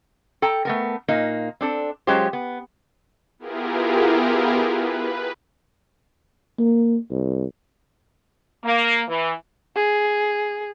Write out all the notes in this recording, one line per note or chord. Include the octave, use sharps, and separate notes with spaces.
A4 G5 A#5
A3 B3 A#4
A#2 A#3 D#4
C4 D4 A4
F#3 G#3 C#4 F4 G4 C5
B3
B3 E4 F4 G4 G#4 A#4
B4
A#3
C2
A#3
E3
G#4